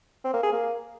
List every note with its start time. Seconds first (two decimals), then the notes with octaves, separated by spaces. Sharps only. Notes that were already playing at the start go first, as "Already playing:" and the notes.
0.24 C4
0.34 A#3
0.43 G#4
0.52 A#3